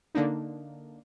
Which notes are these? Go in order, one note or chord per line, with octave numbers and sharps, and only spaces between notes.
D3 A#3 D4 D#4